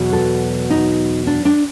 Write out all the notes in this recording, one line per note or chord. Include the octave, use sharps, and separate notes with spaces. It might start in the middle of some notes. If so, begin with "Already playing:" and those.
Already playing: E2 B2 F#3
A4
D#4
D4
D4